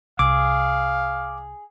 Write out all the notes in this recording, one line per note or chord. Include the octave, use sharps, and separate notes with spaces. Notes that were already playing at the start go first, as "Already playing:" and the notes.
C2 G#4 F5 D6 E6